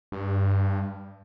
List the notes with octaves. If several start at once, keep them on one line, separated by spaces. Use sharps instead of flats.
G2